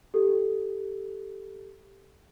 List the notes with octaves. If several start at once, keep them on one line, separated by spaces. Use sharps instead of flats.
G4 A4